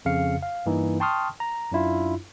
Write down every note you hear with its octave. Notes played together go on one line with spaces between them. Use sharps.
F2 C#3 F5 C#7
F5
G2 E3 A#3 D#4
G5 A5 C6 C#6 D#6 F6
A#5
F#2 D4 E4 F4